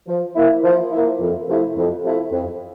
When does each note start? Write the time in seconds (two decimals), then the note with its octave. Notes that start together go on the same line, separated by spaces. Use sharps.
0.07 F3
0.36 A#3 E4
0.64 F3
0.91 A#3 E4
1.20 F2
1.48 C3 F3 A3 E4
1.76 F2
2.03 C3 F3 A3 E4
2.32 F2